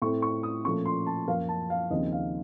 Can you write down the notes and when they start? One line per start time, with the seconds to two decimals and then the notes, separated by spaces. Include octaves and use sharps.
0.02 A2 A3 C4 C#6
0.22 C#6
0.43 D#6
0.64 A#2 F3 A3 C#4 C#6
0.86 C6
1.07 A5
1.28 F#2 F3 A#3 F5
1.49 A5
1.70 F5
1.91 D#2 C#3 F3 C4 D#4 D#5
2.12 F5